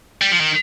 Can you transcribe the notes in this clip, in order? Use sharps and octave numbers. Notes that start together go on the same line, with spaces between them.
G3
F3
D#3